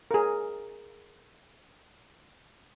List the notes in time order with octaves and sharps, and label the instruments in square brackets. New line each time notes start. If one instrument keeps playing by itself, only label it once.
[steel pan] G#4 A#4